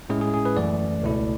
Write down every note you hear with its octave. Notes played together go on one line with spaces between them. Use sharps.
A2 G#3 C#4 E4 G#4
G#4
G#4
B4
F#2 E3 A3 D5
C#2 B2 A3 E4